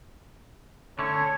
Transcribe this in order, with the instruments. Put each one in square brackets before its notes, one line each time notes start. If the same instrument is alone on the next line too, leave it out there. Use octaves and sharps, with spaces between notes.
[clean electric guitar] D3 C#4 [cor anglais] A3 [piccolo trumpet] C#5